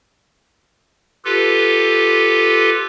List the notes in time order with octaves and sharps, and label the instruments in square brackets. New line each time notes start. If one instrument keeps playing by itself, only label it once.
[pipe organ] F4 G4 A4 B4